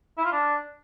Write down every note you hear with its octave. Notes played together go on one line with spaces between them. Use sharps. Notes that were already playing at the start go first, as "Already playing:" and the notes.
E4
F4
D4